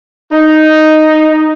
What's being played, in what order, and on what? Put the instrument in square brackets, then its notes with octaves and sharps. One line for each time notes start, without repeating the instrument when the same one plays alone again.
[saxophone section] D#4